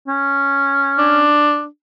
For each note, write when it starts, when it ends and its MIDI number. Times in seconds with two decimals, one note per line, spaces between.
0.08 1.27 61
0.98 1.65 62